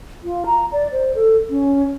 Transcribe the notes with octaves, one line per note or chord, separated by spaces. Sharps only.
F4
A#5
D5
C5
A4
C#4